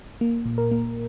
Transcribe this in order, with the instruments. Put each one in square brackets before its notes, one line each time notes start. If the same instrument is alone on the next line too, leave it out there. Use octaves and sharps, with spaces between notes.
[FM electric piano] A#3
A#2
A#4
A#3